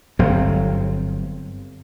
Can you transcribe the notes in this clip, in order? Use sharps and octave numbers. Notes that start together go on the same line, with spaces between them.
G1 G2 F#3 C4